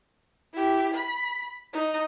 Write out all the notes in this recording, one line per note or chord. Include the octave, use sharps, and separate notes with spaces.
E4 G4
B5
D#4 D#5